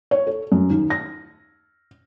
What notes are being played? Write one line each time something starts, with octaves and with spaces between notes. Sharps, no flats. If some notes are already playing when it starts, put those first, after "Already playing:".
C#5
A4
F#2
D#2
A#6